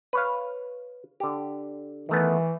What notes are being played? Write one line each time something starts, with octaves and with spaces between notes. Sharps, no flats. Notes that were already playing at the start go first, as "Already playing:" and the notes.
B4 C#5 F5
D3 G4
D#3 E3 A3 B3